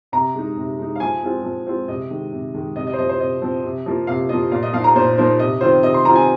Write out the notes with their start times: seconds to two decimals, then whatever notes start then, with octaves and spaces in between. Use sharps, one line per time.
0.12 C3 A#5
0.35 G#3 D#4
0.57 C3
0.79 G#3 D#4
0.96 F5
1.00 F3 G#5
1.23 G#3 C4 F4
1.44 F3
1.66 G#3 C4 F4
1.88 C3 D#5
2.10 D#3 G#3
2.33 C3
2.54 D#3 G#3
2.76 C3 D#5
2.87 D#5
2.93 C5
2.99 F3 C4 D#5
3.09 C5
3.20 C3 D#5
3.42 F3 C4
3.64 C3
3.86 F3 A#3 F4
4.07 C3 F5
4.29 F3 A#3 F4 D#5
4.51 A#2 F5
4.63 D#5
4.73 F3 A#3 D#4 F5
4.84 A#5
4.95 A#2 C5
5.18 F3 A#3 D#4 C5
5.39 C3 D#5
5.61 D#3 C4 F4 C5
5.83 C3 D#5
5.94 C6
6.05 D#3 C4 F4 A#5
6.15 G#5